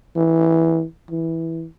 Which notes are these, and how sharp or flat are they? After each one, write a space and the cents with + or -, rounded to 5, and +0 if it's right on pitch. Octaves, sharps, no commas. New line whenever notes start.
E3 -10
E3 -10